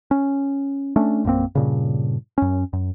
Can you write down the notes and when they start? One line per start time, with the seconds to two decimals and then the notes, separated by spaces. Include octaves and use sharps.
0.11 C#4
0.96 A3 C#4 D4
1.24 A#1 F#2 A#3 C4
1.55 G2 A#2 C#3
2.38 F#2 C#4
2.73 F#2